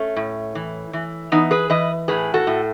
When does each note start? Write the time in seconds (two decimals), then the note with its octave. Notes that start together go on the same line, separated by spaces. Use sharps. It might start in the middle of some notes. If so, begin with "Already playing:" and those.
Already playing: A3 C#4
0.16 A2
0.55 E3
0.93 E3
1.32 E3 B3 D#4
1.51 G#4 B4
1.70 E3 B4 D#5
2.08 A2 G#4 B4
2.34 F#4 A4
2.47 A2